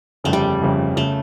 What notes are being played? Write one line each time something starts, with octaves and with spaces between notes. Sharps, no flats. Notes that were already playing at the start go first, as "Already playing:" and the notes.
G1 F2 C#3 A3
G3
G1 F2 C#3
C#3 A3